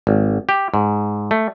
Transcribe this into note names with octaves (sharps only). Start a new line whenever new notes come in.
G#1
G4
G#2
A3